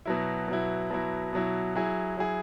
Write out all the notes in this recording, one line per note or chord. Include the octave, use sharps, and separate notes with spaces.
B2 F#3 E4
B2 F#3 E4
B2 F#3 E4
B2 F#3 E4
F#3 E4 G#4
F#3 E4 G#4